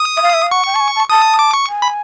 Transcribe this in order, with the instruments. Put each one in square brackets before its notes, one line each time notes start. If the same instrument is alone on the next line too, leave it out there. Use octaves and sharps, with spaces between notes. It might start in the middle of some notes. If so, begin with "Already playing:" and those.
Already playing: [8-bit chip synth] D#6
[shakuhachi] E5
F5
E5
F5
[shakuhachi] F#5 [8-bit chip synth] C#6
[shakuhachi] G5
A5
G#5
A5
[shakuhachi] A5 [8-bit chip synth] D#6
[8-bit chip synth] D6
C#6
[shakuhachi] G#5
[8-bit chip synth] B5